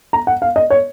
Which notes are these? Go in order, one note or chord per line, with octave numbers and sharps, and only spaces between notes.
A#5
F#5
F5
D#5
C#5